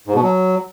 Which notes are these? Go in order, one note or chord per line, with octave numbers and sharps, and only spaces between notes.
G#2
B2
F#3